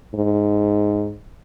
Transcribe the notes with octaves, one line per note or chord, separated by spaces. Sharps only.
G#2